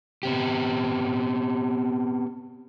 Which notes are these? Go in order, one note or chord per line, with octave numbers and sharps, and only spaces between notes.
B3 C4 G4